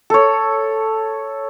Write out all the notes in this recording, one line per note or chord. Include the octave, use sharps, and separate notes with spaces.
A4 C#5